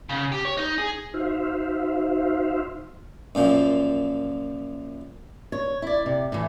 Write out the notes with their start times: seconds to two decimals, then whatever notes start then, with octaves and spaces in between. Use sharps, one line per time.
0.10 C#3
0.32 G4
0.45 C#5
0.57 D#4
0.78 G#4
1.14 D#4 F#4 C5 E5 F5
3.35 F#2 A#2 F3
5.52 C#5
5.82 E4 D5
6.06 C3
6.32 A2 E3